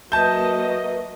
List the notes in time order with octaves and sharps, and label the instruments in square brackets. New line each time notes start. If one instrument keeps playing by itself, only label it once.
[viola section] F#3 A#3 D#5 [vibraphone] B4 E5 [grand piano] A5 G6